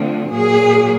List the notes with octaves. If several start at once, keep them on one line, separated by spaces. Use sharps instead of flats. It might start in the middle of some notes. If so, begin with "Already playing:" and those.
Already playing: D3 F3 A3 C4
A#2 F#3 A#3 G#4